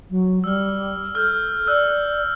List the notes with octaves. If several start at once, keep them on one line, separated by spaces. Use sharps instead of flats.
F#3
G3 E6 F6
A4 F6 G6
D5 E6 F#6